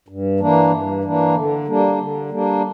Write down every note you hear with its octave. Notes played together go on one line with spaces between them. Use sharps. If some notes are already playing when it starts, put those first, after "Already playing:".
G2
E3 A#3 D4
G2
E3 A#3 D4
D3
G3 A#3 D4
D3
G3 A#3 D4